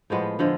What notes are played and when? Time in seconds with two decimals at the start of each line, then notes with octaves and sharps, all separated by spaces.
0.10 A2 F3 G#3 B3
0.39 D3 F3 G#3